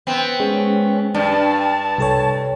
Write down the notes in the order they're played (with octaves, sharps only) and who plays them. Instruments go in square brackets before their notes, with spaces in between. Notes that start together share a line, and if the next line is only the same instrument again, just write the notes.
[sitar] B3 C4
[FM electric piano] G#3 [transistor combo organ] C#4
[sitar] G2 [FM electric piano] D4 [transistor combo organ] A5
[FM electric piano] C2 A4 C#5